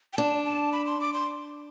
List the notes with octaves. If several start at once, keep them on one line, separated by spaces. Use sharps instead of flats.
G5
D4 A5
A5
B5
C6
D6
C6